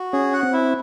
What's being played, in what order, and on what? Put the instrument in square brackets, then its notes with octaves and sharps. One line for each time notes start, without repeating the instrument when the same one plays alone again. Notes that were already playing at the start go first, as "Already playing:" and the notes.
Already playing: [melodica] F#4
[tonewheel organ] C#4 [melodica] G#4
[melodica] F#5
[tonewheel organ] C4
[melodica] E4